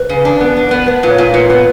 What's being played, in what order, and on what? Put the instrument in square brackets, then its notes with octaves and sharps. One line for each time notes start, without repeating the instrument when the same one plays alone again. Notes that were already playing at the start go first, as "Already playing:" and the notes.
Already playing: [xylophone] B4
[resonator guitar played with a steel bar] C#3
D4
B3
D4
B3
[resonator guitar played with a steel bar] B3 [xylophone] B4
[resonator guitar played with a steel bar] A#2
[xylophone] C#5
[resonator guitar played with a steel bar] A#2
[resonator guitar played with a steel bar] A#2 [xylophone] B4
[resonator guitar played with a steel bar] B3